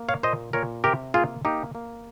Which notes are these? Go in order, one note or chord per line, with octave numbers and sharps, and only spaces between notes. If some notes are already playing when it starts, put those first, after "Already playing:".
Already playing: A#3
C#5 F5
A#2 C5 D#5
A#2 A#4 C#5
C3 G4 A#4
A#3 F4 G#4
A#3 D#4 G4
A#3